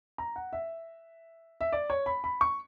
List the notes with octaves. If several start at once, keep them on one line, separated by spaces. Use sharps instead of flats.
A#5
F#5
E5
E5
D5
C#5
B5
B5
C#6